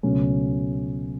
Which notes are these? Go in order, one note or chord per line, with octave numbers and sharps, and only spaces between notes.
C#2 B2 F#3 A3 C#4